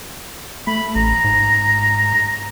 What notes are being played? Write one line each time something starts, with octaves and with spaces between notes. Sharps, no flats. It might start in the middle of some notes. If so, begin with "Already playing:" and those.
A3 B5
A1 A#5
G#2